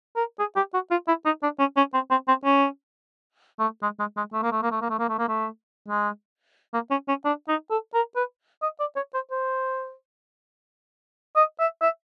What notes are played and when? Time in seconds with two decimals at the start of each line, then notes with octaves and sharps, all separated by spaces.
0.16 A#4
0.39 G#4
0.56 G4
0.74 F#4
0.91 F4
1.08 E4
1.25 D#4
1.43 D4
1.59 C#4
1.77 C#4
1.94 C4
2.11 C4
2.28 C4
2.45 C#4
3.60 A3
3.83 G#3
3.99 G#3
4.17 G#3
4.33 A3
4.43 A#3
4.52 A3
4.62 A#3
4.72 A3
4.81 A#3
4.90 A3
4.99 A#3
5.09 A3
5.18 A#3
5.28 A3
5.88 G#3
6.74 A#3
6.91 C#4
7.08 C#4
7.25 D4
7.48 D#4
7.71 A4
7.94 A#4
8.16 B4
8.62 D#5
8.80 D5
8.96 C#5
9.14 C5
9.31 C5
11.36 D#5
11.60 E5
11.82 E5